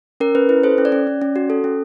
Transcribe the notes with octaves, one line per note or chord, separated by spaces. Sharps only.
C#4 A#4
C#4 B4
E4 B4
A4 C5
C#4
D5
C#4
C#4
C#4
F#4
A4
C#4